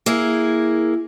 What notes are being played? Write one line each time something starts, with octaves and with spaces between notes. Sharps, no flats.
A#3 E4 G#4